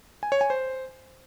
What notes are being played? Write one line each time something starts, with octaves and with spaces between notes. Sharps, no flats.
G#5
C#5
G#5
C5